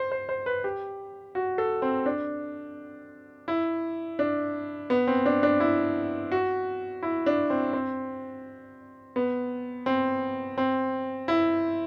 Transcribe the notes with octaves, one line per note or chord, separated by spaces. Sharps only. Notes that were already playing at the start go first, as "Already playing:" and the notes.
Already playing: C5
C5
C5
B4
G4
F#4
A4
C4
D4
E4
D4
B3
C4
D4
D4
E4
F#4
E4
D4
C4
C4
B3
C4
C4
E4